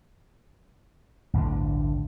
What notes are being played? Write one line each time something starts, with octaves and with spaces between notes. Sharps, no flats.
A1 D2 G2 D3